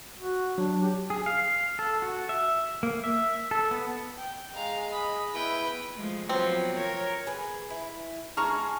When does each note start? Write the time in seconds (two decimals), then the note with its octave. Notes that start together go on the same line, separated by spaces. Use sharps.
0.19 F#4
0.58 F#3 D4
0.83 G4
1.10 G#4
1.26 F5
1.79 A4
2.02 F#4
2.29 E5
2.83 A#3
3.04 E5
3.51 A4
3.71 B3
4.18 G5
4.55 G#3 F5 A#5
4.91 D#5 B5
5.34 B3 E4 B4 G5
5.96 F3 G#3 A3
6.29 F3 F#3 B3 C4
6.77 A#4 C#5
7.27 G#4 B4
7.70 E4
8.37 G#3 G#4 A5 A#5 C#6 F6